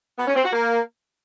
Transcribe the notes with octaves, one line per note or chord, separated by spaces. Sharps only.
B3
C#4
C4
F#4
A#3